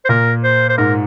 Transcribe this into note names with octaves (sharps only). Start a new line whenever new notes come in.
C5
A#2 A#4
C5
C5
G#2 A#4